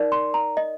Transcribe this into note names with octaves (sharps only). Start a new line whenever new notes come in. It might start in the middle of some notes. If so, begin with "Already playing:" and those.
Already playing: D#4 A#4 D5
C6
A#5
D#5